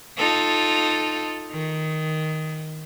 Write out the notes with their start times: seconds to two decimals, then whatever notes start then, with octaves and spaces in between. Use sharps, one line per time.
0.18 D#4 F4 A4
1.51 D#3